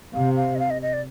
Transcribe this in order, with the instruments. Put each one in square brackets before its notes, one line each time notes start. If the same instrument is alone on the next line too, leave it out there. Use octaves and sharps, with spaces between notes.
[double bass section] C3 [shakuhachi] F5
[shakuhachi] F5
D#5
F5
D#5
D#5
D5